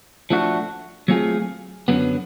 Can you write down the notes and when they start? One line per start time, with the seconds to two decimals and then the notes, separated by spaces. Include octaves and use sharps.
0.30 F3 A3 D4 F#4
1.08 F#3 A3 C4 F4 G#4
1.88 F#2 D3 F#3 B3